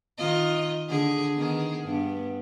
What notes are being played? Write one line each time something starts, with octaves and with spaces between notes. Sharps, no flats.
D#3 F4 D#5
D3 G#4
D#3 B3 G#4
G2 B3